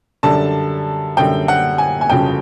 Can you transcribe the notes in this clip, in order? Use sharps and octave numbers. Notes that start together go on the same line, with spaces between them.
F#2 D3 G3 A5
F#2 D3 G3 G5
F#5
G#5
G#5
G1 F2 C#3 F#3 G5